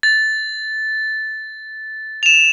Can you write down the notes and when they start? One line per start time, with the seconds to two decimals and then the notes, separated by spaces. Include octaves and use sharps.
0.03 A6
2.23 E7 F7